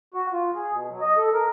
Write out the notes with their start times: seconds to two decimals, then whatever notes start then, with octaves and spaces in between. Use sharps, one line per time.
0.14 F#4
0.33 F4
0.55 G#4
0.72 B2
0.89 F#3
1.01 D#5
1.17 A4
1.33 A#4